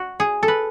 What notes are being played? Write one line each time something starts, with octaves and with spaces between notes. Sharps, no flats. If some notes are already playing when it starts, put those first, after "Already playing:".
Already playing: F#4
G#4
A4
B4